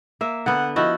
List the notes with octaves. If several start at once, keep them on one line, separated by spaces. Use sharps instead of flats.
A#3 E5
D3 B3 F#5
F3 E4 F#4 D#5